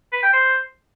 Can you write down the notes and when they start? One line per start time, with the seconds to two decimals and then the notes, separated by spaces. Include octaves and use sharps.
0.13 B4
0.23 G5
0.33 C5